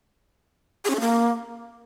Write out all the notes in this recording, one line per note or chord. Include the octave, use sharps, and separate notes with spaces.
G#4
C#4
A4
A#3